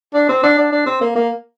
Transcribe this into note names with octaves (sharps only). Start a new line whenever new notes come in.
D4
C4
D4
D4
D4
C4
A#3
A#3